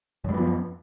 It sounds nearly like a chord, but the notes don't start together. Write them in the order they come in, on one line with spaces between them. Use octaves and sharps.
F#2 G3 B3 F3